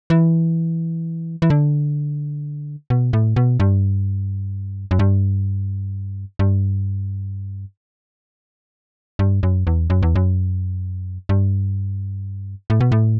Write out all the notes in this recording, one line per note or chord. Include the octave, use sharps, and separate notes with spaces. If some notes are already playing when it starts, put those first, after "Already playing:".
E3
E3
D3
B2
A2
B2
G2
F#2
G2
G2
G2
F#2
E2
F#2
E2
F#2
G2
A2
B2
A2